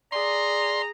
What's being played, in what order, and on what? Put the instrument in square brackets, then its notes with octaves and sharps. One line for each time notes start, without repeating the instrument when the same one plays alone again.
[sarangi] G#4 [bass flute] D5 [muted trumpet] A#5 [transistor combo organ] C6